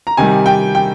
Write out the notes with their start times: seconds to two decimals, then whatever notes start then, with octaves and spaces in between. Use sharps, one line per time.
0.07 A#5
0.17 C3 D#3 G3 G#5
0.46 G5
0.75 G5